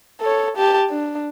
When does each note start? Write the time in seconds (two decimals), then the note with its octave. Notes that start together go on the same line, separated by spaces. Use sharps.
0.21 A4 C#5
0.57 G4 A5
0.90 D4